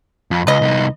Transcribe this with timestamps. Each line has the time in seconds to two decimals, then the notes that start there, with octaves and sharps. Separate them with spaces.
0.31 F2
0.47 C#2 B4 D#5
0.62 C2 D#4